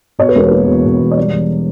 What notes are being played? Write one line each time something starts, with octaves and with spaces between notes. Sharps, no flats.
B2 C#5
B4
E1 A#4
B4
A#3
E2
B2
E1
C#5
G3 D5
E2